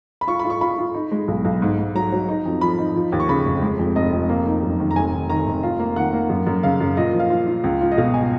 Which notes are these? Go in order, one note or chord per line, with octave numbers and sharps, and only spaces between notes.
B5
F4 C#6
B5
F4
C#6
F4 B5
F4
D#4
G#3
B1
B1
G#2
G#2
F#3 A#5
F#3
D#4
F2
F3 B5
D#4
F3
D#2
C#6
C#3 B5
F1
G#3
F2
F1 D#5
F2
A#3
D#4
F#2
D#3
A#5
F1 G#5
D#3
D#3 A#5
F1
F4
A#3
D#3 F#5
A#3
F#2
F#2
C#3 F5
F#2
A#2 D#5
F3
F5
F4
F4
C#2
F4
D#5
B2 F5
G#5